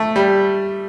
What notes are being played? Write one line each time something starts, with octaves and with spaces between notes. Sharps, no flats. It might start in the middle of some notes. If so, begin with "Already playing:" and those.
Already playing: A3
G3